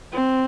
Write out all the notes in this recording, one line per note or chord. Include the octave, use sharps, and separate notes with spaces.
C4